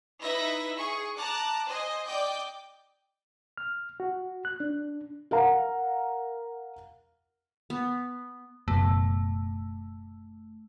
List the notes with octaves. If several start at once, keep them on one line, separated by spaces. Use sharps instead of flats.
D#4 E4 B4 E5 A#6
G#4 C#6
A5 A#5 D6 F#6
C5 D#5 G#5
D5 D#5 G5 D6 G6
F6
F#4
F#6
D4
A#4 F5 F#5 A#5
B3
F#1 B2 A3